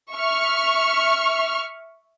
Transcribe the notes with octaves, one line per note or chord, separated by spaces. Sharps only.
E5 C#6 F6